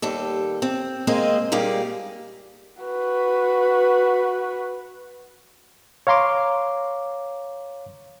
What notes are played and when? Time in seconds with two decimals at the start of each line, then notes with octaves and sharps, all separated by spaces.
0.02 D#2 G3 A4
0.62 C4
1.07 G#3 A#3 C4 G#4 D#5
1.52 A#2 G3 A#3 G4 G#4
2.82 F#4 B4
6.07 C#5 F5 A#5 C6 D6